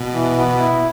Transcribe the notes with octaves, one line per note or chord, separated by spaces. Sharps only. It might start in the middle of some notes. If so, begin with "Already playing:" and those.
Already playing: B2
E3
B3
E4